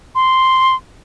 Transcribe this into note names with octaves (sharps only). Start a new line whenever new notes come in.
C6